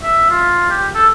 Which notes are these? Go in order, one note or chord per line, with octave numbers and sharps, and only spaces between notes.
E5
F4
G4
A4